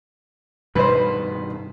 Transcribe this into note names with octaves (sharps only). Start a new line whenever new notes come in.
G2 B2 D#3 B4 C5